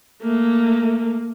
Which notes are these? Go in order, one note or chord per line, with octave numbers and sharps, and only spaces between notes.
A3 A#3